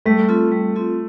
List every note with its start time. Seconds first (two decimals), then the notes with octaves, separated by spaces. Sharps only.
0.06 G3 A3
0.29 C4 F4 A4
0.52 G3
0.76 C4 F4 A4